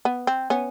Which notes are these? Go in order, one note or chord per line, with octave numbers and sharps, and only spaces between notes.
B3
C4
B3 C#4